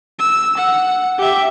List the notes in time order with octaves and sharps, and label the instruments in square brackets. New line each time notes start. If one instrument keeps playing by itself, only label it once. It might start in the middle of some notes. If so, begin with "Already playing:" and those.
[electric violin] E6
F#5
G4 E5